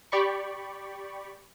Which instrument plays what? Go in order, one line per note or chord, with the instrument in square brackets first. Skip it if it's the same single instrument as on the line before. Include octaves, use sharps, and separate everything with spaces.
[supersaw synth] G4 D5 B5 C#6